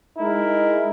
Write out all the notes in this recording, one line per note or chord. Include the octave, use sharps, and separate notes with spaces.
G#3 D#4 E4 A#4